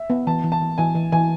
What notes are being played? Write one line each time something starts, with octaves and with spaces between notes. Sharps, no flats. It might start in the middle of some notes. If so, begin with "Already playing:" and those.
Already playing: E5
B3
E3 A5
E3
A5
E3
E3 G#5
E3
E3 G#5